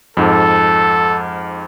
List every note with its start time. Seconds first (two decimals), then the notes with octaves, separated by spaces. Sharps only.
0.17 F2 G#2 A4